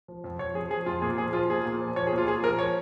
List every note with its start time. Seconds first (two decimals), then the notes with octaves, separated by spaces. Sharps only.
0.08 F3
0.24 F2
0.39 F2 C#5
0.54 F3 G#4
0.71 F3 G#4
0.86 F2 F4
1.02 A#2 G#4
1.18 F3 G#4
1.33 F3 F4
1.50 A#2 G#4
1.65 A#2
1.81 F3
1.96 F3 C#5
2.07 G#4
2.13 A#2
2.18 F4
2.27 A#2 G#4
2.43 F3 A#4
2.59 F3 C#5